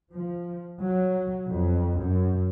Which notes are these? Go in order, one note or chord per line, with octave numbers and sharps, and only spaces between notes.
F3
F#3
F2
F#2